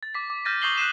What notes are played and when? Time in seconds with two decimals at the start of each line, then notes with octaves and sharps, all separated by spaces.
0.03 A6
0.14 D6 B6
0.30 D6
0.45 F6 G6 A6 A#6 D#7
0.62 C#6 D#6 G6 C7 F#7 G7
0.78 F#6 G6 C7 E7